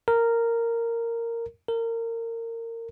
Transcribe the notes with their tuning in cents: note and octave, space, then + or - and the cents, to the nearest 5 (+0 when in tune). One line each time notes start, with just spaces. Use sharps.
A#4 -10
A#4 -25